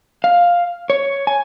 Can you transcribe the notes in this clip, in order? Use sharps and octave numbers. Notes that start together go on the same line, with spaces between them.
F5
C#5
G#5